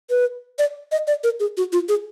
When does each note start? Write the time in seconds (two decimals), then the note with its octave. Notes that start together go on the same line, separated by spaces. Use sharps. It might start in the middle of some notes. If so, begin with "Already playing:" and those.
0.10 B4
0.59 D5
0.92 D#5
1.07 D5
1.24 A#4
1.40 G#4
1.57 F#4
1.73 F4
1.89 G#4